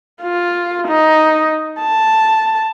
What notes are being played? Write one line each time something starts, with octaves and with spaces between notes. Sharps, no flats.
F4
D#4
A5